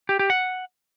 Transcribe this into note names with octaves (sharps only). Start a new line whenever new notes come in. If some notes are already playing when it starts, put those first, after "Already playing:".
G4
G4
F#5